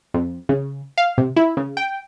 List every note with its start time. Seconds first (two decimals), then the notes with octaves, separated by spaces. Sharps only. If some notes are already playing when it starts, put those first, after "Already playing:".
0.14 F2
0.49 C#3
0.98 F5
1.18 C3
1.36 E4
1.57 C#3
1.77 G5